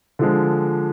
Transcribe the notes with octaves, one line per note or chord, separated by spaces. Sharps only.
D3 F3 G#3